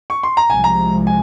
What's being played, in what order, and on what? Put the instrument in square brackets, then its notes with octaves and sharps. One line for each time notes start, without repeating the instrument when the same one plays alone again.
[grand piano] C#6
C6
A#5
[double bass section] C2 C3 F3 G#3 [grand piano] G#5
[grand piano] A#5
G#5